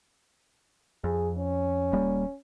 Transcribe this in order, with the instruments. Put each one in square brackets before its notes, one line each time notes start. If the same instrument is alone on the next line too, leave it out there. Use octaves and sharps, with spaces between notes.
[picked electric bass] F2 [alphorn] G#4
[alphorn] C#4
[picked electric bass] D#1 G3 A#3